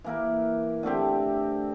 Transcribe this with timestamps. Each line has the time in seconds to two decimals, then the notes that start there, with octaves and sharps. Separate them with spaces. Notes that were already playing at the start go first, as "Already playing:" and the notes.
0.04 E3 A#3 E4 A#4
0.83 D3 A3 C4 G4